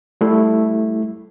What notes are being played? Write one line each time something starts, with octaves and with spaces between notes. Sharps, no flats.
G3 A3 E4